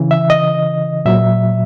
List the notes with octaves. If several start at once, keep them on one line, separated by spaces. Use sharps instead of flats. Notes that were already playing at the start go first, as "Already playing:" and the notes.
Already playing: C#3 E3
E5
D#5
A#2 F#3 E5